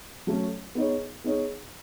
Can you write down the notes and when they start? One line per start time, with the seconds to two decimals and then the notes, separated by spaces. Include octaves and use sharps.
0.27 F#3 A3 C#4
0.75 B3 D#4 G#4 C#5
1.24 B3 D#4 G#4 C#5